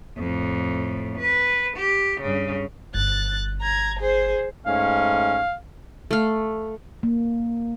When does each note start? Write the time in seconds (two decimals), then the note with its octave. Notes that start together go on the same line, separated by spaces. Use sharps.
0.18 F2 A2
1.18 B4
1.77 G4
2.21 G2 C#3
2.94 G1 F#6 A6
3.61 A#5 G#6
3.99 G#4 C5
4.67 G#2 A3 C#4 F5
6.11 A3 F5
7.03 A#3